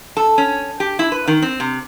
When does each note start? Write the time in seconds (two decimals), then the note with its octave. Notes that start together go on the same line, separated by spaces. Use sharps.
0.17 A4
0.38 C#4
0.80 G4
0.99 E4
1.12 B4
1.28 D#3
1.42 C4
1.60 C3